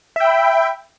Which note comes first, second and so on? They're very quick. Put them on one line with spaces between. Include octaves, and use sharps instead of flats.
E5 G5 B5